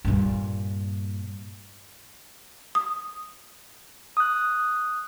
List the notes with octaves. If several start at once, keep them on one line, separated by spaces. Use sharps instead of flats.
G2 A#2
D#6
D#6 F#6